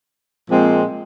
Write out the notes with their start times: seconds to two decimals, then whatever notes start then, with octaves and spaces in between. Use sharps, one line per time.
0.50 A#2 F3 G#3 C4